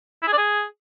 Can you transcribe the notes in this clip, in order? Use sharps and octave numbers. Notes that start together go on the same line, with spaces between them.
E4
G#4
D5
G#4